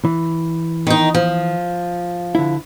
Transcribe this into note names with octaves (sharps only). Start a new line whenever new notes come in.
E3
D#3 D#4
F3
D3 E4